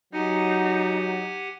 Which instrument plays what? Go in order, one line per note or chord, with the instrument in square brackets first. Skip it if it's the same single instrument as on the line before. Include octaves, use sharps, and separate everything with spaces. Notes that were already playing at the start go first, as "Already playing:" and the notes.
[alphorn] F#3 [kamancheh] D#4 [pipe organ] G4 F#5 G#5